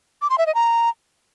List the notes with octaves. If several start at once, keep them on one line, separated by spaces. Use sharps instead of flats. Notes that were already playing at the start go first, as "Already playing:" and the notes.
D6
C6
E5
D#5
A#5